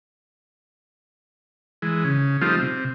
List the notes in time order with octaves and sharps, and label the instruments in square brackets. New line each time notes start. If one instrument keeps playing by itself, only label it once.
[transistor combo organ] E3 G#3
C#3
F3 G3 A3 C4 D#4 F4
C3